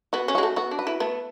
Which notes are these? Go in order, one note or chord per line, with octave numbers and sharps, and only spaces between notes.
B3 F#4
C#4
G#3 F#4
A3
B3 F#4
D4
B4
E4
A3 B3